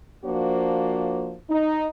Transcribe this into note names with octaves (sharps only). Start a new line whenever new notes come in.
F3 A#3 D4 F#4 C5
D#4